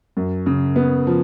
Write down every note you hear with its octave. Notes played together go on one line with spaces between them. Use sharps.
F#2
C#3
B3
F3